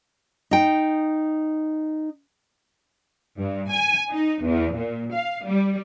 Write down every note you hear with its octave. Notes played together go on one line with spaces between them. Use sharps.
D#4 G5
G2
G#5
D#4
E2
A#2
F5
G3